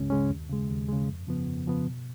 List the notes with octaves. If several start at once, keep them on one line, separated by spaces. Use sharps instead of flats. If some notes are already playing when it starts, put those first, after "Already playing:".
Already playing: C#2 C#3 G#3 C#4
C#3 G#3 C#4
D#2
C#3 G#3
D#2
C#3 G#3
F2
C#3 F3 B3
F2
C#3 F3 B3
B2